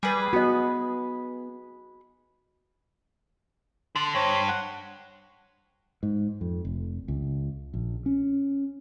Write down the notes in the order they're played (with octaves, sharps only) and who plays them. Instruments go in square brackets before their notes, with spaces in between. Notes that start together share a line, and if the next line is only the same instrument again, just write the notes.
[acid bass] G3 [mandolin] G#4 B4
[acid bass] B3 [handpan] F#4 D#5
[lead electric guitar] D3 [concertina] A5 C6
[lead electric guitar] G2 [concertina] C5 C#5
[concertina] F#5
[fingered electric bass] G#2
F2
F1
C#2
A#1
C#4